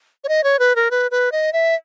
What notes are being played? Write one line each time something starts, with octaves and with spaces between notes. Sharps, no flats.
C#5
D#5
C#5
B4
A#4
B4
B4
D#5
E5